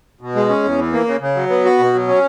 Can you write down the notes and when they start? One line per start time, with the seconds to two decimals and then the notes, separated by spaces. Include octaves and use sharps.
0.21 B2
0.35 G#3
0.48 C#4
0.63 E2
0.78 E3
0.93 A#3
1.07 C#3
1.20 C#3
1.36 F#3
1.49 B3
1.65 F#4
1.79 B2
1.94 F#3
2.08 C#4